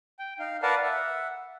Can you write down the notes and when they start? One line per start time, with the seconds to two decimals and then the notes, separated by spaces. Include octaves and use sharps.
0.19 G5
0.39 D#4 F5
0.62 A#4 B4 D5 F5 F#5 A5
0.83 E5 F#5